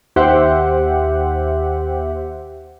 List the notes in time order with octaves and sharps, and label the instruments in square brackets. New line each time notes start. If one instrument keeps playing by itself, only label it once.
[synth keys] D#2 G4 C5 E5 F#5